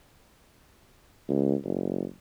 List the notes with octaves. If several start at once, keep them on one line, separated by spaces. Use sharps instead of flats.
C#2
F#1